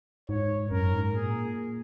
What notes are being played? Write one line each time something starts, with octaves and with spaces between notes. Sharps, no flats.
G#2 C#5
F#2 A#4
G#2
A#2 G#4